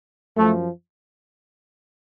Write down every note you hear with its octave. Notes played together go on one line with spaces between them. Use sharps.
F#2 F3 A3